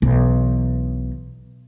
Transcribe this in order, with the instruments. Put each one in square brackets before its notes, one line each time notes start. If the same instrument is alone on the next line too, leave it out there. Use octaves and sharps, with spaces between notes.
[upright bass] B1 E3